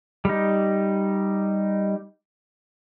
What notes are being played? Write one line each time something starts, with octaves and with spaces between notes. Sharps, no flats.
G3 D#4